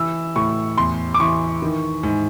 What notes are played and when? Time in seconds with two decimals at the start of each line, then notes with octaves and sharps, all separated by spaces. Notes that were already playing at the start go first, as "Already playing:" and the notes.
Already playing: E3 E6
0.36 A2 C#6
0.78 E2 C6
1.14 D6
1.20 E3 C#6
1.62 D#3
2.03 G#2